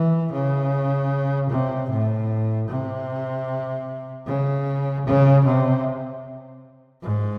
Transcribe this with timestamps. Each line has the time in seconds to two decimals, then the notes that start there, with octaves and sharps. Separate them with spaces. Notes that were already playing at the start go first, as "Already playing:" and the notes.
Already playing: E3
0.32 C#3
1.50 C3
1.90 A2
2.68 C3
4.27 C#3
5.06 C#3
5.45 C3
7.02 G#2